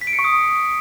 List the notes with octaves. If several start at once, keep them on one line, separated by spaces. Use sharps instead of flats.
B6
D7
C#7
C#6
D#6